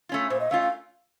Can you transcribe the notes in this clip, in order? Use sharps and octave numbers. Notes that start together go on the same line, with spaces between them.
A3 C#4 F4
A#2 C5
D#5
A3 C#4 F4 F5
F5